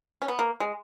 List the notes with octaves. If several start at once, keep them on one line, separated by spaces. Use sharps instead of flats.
C#4
B3
A#3
G#3